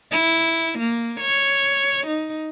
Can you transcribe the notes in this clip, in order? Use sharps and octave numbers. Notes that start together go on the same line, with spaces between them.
E4
A#3
C#5
D#4